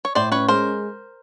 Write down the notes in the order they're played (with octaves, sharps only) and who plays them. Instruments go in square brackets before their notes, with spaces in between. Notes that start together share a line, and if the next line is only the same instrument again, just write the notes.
[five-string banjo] C#5
[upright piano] A2 [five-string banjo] C5 D5
[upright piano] C#4 [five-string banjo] B4 C#5
[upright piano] G#3 [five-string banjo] A#4 C5